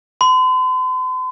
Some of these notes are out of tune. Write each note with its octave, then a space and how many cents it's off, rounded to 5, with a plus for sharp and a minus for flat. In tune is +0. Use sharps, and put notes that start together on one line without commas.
C6 -45